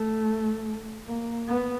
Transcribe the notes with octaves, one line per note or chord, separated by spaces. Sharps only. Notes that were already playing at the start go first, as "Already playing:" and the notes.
Already playing: A3
A#3
B3